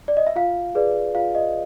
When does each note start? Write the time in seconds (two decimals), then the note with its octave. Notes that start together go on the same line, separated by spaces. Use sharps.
0.08 D5
0.17 D#5
0.27 E5
0.36 F4 F5
0.75 G#4 B4 D5
1.15 F4 F5
1.35 D#5